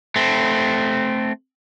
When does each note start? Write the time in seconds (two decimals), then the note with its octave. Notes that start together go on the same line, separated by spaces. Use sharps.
0.16 A3 C4